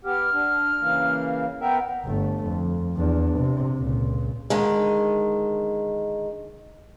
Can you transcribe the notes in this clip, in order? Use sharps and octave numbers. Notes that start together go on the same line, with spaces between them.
B3 G4 F6
D4
C#3 E3 A#3
B3 A#4 E5 G5
G1 A3
F2
E2 D4
C3
C#2 A#2
D3 D#3 G#3